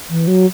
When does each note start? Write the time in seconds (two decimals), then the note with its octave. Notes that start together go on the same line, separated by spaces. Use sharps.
0.10 E3
0.27 F#3